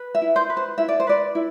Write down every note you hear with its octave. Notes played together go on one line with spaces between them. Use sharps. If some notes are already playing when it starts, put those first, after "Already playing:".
Already playing: B4
E5
E4
C5
B4
C5
E4 E5
D5
C5
B4 D5
E4